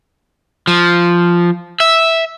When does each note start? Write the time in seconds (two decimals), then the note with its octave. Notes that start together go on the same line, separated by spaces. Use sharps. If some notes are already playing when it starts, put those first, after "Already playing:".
0.67 F3
1.80 E5